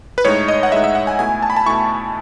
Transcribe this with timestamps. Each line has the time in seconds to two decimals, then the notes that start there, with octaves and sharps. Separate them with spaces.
0.18 B4
0.24 A2 G#3 D#4 C#5
0.48 D#5
0.63 F#5
0.72 A2 G#3 D#4 E5
0.84 E5
0.95 F#5
1.07 G#5
1.19 B2 A3 E4 G#5
1.42 A5
1.50 B5
1.56 A5
1.66 B2 A3 E4 C#6